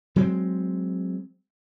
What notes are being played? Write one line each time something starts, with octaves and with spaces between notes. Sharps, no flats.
F#3 G#3 C4